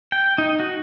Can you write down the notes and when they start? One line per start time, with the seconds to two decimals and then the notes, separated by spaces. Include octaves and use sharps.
0.12 G5
0.38 D#4
0.60 F#4